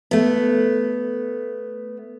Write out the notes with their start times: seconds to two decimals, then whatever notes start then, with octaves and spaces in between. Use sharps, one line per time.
0.11 A3 B3